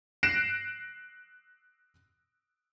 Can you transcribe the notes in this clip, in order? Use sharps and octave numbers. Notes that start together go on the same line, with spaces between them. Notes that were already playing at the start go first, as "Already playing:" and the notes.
F#6 A#6 C7 D7 E7